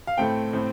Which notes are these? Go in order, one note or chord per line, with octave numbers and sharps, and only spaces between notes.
F5
A2 A3 C4 G5
A2 A3 C4